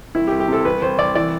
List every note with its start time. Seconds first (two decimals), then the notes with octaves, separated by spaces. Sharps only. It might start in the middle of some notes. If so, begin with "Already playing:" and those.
0.15 C2 E4
0.27 G4
0.32 C2
0.40 G4
0.48 C3 A4
0.65 C2 B4
0.82 C2 C5
0.98 C2 D5
1.15 E3 D5